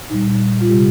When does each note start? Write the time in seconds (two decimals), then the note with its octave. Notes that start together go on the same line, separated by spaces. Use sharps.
0.10 A#2 G3 D#4
0.61 F4
0.69 C3 G3 G4